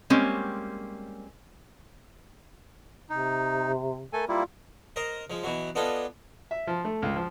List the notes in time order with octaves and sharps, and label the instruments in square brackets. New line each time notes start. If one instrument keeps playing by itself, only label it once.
[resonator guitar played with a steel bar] G3 G#3 A#3 C4 C#4
[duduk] C3 [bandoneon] D#4
[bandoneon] A3 A4 G#5 [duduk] A#4
[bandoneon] G3 A#3 E4 [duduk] F4
[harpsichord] A#4 C5 D#5 A#5
F3 G#3
B2 E3 F#3
B3 D4 F4 A4 D#5 G#5
[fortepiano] E5
F3
A3
C#2
F3